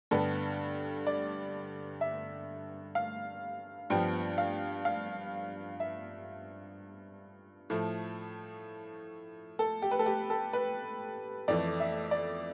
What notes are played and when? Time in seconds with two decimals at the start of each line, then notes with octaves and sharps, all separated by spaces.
0.11 G2 D3 G3 B3 A4
1.07 D5
2.01 E5
2.95 F5
3.90 G2 F3 B3 G5
4.38 F5
4.85 F5
5.80 E5
7.70 A2 F3 A3
9.59 A4
9.82 G4
9.91 B4
9.99 A4
10.06 G4
10.30 A4
10.53 B4
11.48 F2 E3 A3 D5
11.80 E5
12.11 D5